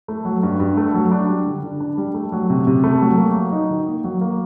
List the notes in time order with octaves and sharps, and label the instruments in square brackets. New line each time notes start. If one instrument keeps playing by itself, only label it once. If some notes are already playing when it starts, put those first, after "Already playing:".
[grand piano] A3
F#3
G2
G2
A3
F#3
D4
G3
D3
D3
D4
G3
A3
F#3
C3
C3
A3
F#3
A#3
F#3
D#4
D#3
A#3
F#3
A#3